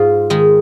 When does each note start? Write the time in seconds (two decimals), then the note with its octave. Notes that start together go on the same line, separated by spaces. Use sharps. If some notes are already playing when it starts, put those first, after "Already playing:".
Already playing: G#2 F4
0.30 D#3 G#3